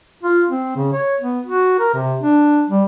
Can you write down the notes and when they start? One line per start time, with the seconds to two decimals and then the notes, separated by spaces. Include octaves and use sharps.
0.23 F4
0.50 C4
0.76 C#3
0.93 C#5
1.21 B3
1.46 F#4
1.79 A#4
1.94 C3
2.21 D4
2.70 G3